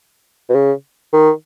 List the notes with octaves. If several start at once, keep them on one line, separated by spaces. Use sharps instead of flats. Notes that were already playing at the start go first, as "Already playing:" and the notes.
B2
C#3
D#3